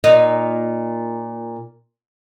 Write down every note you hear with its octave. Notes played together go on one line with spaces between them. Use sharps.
A#2 D#4